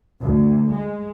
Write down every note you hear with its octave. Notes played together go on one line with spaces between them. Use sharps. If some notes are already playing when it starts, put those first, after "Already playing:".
D2
G#3